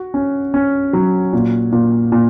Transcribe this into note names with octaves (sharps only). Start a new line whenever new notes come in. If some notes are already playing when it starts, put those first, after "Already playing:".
Already playing: F#4
C#4
C#4
F#3
A#2
A#2
A#2